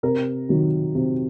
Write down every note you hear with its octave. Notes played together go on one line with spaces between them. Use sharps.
C3 A#4
D#3 F#3
C3